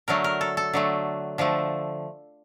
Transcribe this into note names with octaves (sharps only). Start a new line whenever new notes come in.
D3 F#3 A3 A#4
A#4
A4
A4
D3 F#3 A3
D3 F3 A3